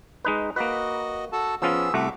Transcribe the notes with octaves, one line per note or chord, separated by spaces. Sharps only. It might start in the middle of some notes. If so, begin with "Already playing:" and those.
G#3 D#4 B4
A#3 F#4 B4 D#5
F#4 A4 A5
F3 B3 C#4 F4 G#4 E6
C2 A3 F#4 E5 D6